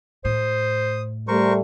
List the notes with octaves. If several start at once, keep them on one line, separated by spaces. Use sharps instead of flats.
A2 C5 D#6
G3 A3 A#4 C5 C#6